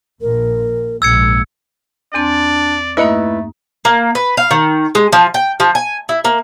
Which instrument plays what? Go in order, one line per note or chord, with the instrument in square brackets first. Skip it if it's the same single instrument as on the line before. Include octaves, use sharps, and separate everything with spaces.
[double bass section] A#1 A#2 [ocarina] A#4
[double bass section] A#1 G#2 [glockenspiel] E6 G#6 C#7
[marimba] E2 C4 C6 [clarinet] D4 [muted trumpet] D5
[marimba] G2 A#3 D#4 [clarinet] A3 [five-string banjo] E4 B4 D#5
[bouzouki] A#3
B4
F5
D#3
G#3
F3
G5
F3
G#5
E4
A#3